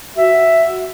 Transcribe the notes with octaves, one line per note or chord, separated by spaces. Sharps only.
F#4 E5